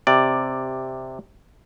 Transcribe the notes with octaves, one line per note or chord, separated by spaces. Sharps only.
C3 D5